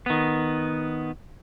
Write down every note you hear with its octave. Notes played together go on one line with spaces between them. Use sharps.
D#3 B3